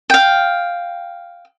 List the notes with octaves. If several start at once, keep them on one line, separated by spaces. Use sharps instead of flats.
F5 G5